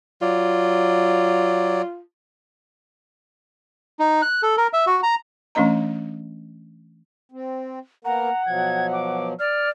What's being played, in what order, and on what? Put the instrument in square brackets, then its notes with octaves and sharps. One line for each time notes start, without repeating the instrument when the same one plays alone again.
[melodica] F#3 D5 [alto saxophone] F4
[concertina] D#4
F#6
A4
A#4
E5
F#4
A#5
[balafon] E3 A3 C#4 D4 D#5 A#5
[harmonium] C4
[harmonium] A#3 B3 A#4 [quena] F#5 [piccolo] A#5
[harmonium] B2 F3 F#3 [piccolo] G#6
[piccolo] D6
[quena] D5 [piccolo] F6